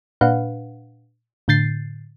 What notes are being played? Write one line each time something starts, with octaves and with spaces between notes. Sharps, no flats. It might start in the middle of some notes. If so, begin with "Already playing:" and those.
A#2 D4 B4 F5 F#5
A2 D3 G6 A6 C7